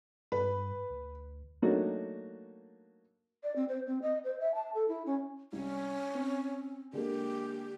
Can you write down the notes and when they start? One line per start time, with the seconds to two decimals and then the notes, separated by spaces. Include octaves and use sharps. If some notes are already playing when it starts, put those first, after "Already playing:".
0.32 G2 B4
0.90 D2
1.62 F#3 A3 A#3 D4 D#4 F#4
3.43 D5
3.56 C4
3.69 C5
3.87 C4
4.02 D#5
4.24 C5
4.40 E5
4.55 A5
4.74 A4
4.88 E4
5.06 C#4
5.53 C2 C#4
6.15 C4
6.93 D3 G#3 A#3 G4